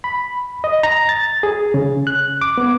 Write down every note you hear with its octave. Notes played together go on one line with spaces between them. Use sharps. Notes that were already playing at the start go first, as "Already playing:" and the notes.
B5
D#5
A#5
A6
G#4
C#3
F#6
D6
B3